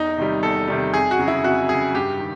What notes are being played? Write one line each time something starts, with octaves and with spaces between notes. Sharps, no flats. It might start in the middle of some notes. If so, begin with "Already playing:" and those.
Already playing: E2 D#4
C3 D#3 G3
E2 A4
C3 D#3 G3
F2 G#4
F#4
C#3 F#3
E4
F2 F#4
C#3 F#3 G#4
G2 G4
D#3